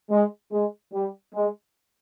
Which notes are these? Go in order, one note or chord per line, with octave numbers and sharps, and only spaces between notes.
G#3
G#3
G3
G#3